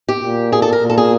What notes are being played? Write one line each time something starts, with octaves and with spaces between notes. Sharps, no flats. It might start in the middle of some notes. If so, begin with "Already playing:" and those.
G4
A#2
G#4
A4
A#4
A#2
A4
G#4